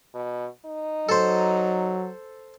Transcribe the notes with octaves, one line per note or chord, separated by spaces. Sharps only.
B2
D#4
F#3 A4 C5